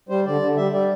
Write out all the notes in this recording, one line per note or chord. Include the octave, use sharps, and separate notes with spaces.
G3 C5
D3 D5
D3
G3 E5
G3 D5